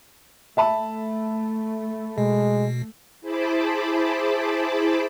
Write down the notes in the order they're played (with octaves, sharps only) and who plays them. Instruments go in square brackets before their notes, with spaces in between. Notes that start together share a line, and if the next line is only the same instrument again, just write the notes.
[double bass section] A3 [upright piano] E5 A5 B5
[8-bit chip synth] B2 [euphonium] G#3
[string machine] E4 G#4 C5 A5 B5 D6